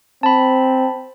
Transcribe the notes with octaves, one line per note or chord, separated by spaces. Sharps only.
C4 A5 B5